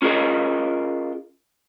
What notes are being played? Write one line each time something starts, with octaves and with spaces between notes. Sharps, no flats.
C#4 F4 G#4 A#4 D#5